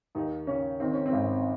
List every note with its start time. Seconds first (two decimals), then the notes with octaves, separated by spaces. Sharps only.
0.15 D#2 D#4
0.47 C#3 C#4
0.80 D#3 C4
0.93 C#4
1.06 C4
1.12 G#1